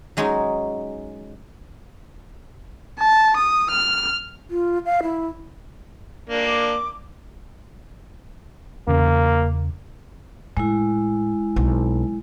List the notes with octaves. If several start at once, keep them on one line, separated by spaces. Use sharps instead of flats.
F#3 G#3 C#4 D#4
A5
D#6
F6
F4
F5
E4
A#3 D4
D6
E2 C#3 A#3
A2 G#3 E4
B1 C4